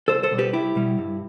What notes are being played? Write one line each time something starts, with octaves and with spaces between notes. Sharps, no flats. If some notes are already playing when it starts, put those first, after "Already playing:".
C2 A4 C5
A4 C5
B2 G3
G4 B4
C2 E4 G4
B2 G3
G2